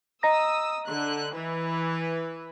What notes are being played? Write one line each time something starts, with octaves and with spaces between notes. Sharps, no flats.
D#5 A#5 D#6 E6 A#6
D3 F#6
E3 B4